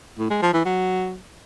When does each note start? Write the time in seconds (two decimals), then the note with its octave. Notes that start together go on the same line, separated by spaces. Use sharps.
0.18 A2
0.30 G#3
0.42 F3
0.54 E3
0.65 F#3